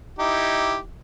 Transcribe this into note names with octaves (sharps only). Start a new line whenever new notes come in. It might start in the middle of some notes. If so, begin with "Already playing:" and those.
D#4 E4 G4